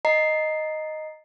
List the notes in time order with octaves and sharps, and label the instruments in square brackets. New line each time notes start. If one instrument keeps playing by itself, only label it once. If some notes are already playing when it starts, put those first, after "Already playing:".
[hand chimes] D#5 A#5 C7